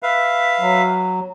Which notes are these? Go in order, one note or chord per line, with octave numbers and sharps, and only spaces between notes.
B4 E5 F5
F#3